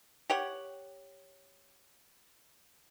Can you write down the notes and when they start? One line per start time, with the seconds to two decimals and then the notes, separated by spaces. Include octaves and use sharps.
0.30 G4 C#5 F#5